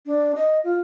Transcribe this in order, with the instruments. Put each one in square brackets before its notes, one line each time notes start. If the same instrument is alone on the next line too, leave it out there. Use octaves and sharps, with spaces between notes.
[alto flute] D4
D#5
F4